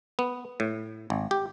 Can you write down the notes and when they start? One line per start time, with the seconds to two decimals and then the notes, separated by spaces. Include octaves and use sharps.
0.19 B3
0.60 A2
1.10 G#1
1.31 G4